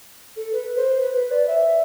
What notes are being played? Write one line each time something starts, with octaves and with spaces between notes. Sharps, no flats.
A4
B4
C5
B4
B4
D5
E5